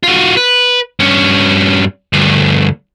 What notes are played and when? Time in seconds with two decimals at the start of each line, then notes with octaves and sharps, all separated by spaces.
0.03 F4 F#4
0.37 B4
1.00 G2 C#4
2.13 D2 G2